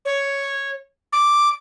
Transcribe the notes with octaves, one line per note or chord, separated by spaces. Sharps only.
C#5
D6